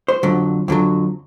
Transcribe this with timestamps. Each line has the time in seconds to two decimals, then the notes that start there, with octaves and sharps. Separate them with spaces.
0.08 C5
0.23 F2 D3 F#3
0.68 F2 D3 F#3